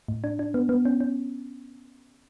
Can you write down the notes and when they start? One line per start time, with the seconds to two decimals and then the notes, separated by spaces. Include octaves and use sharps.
0.08 A2
0.24 D4
0.39 D4
0.54 B3
0.69 B3
0.85 C#4
1.00 C#4